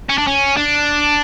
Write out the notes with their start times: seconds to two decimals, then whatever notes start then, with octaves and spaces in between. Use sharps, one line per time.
0.09 C#4
0.18 D4
0.27 C#4
0.56 D4